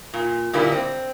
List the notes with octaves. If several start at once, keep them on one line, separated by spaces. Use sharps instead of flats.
A#2
A#2 D3 G3 A#3 E4
C4